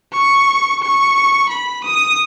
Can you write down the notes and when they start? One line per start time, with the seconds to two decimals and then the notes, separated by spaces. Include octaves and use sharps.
0.13 C#6
0.82 C#6
1.50 B5
1.84 D#6